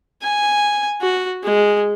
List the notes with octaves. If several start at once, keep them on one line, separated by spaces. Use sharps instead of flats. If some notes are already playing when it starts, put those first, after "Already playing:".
G#5
F#4
G#3